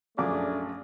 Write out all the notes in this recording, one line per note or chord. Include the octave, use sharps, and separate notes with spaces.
A#1 F#2 A3 D4 G#4 D6